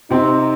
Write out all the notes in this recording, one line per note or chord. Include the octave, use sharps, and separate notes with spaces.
C3 C4 D#4